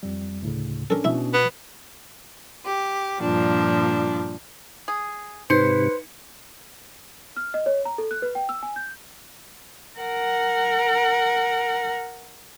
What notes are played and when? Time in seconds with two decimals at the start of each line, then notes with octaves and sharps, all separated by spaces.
0.03 F2 G3
0.42 D2 A2 C#3
0.90 C#4 D4 A4 A#4
1.04 B2 E4 E5
1.33 B3
2.65 G4
3.21 G2 A#2 F3 D4
4.88 G#4
5.50 G#2 C3 D#4 B4 C5 C#7
7.37 F6
7.54 D#5
7.66 C#5
7.85 A#5
7.98 A4
8.11 F#6
8.22 B4
8.35 G5
8.49 E6
8.63 G#5
8.76 G6
9.99 A#4 F#5